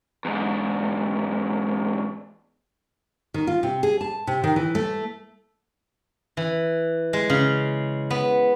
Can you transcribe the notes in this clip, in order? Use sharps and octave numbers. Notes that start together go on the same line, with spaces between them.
E2 G#2
D#3
F4
C3
G#4
A5
C3
D#3
E3
A3
E3
G#3
C#3
B3